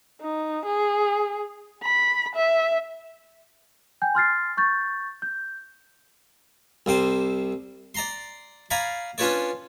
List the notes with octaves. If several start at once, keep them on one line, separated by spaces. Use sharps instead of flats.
D#4
G#4
B5
E5
G5 G#5 G6
C6 F6 A6 C7
C#6 G6 A6
G6
C2 C3 C5 D6
D5 A#5 C6
D5 F5 G#5 A#5 B5
C#4 D4 F4 B4 C#5 D5